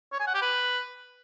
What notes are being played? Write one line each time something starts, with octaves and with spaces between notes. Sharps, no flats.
C#5
G#5
F#5
G4
B4